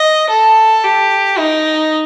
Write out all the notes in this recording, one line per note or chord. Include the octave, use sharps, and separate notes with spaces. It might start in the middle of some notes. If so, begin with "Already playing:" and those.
Already playing: D#5
A4
G4
D#4